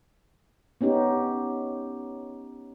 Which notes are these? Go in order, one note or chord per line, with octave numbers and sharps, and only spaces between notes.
B3 C#4 D#4 G4